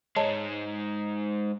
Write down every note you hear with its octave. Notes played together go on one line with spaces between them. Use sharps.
G#2 G#3 C#5 D#5 A5